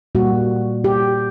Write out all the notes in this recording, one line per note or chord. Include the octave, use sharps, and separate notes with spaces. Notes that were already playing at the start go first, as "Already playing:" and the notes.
A#2 G3 A#3 F#4
G4